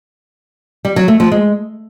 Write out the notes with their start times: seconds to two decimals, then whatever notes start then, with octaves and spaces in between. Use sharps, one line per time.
0.85 G3
0.96 F#3
1.08 A3
1.20 F3
1.32 G#3